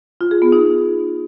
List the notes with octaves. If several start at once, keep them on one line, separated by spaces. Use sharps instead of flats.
F4
G#4
B3
D#4